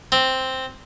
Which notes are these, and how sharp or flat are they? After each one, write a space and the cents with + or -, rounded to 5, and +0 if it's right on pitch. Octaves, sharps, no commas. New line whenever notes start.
C4 +0